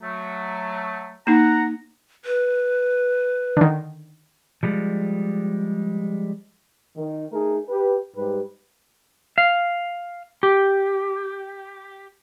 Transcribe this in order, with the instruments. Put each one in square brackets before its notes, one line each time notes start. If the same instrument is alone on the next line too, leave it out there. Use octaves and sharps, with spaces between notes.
[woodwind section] F#3 A3
[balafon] A#3 D#4 [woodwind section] F#5 A#5
[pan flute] B4
[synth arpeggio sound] D3 D#3
[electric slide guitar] F3 G3 G#3
[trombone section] D#3
A3 D#4 G#4 A#4
G4 B4
G#2 G3 G4 B4
[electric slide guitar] F5
G4